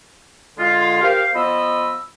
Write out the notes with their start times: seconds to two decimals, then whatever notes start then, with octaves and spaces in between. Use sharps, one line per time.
0.58 D3 G#3 F4
1.02 G4 A#4 C5 F5
1.35 F3 B3 D#5 B5 E6